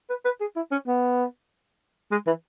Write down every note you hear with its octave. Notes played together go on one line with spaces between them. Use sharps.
B4
B4
G#4
E4
C#4
B3
G#3
E3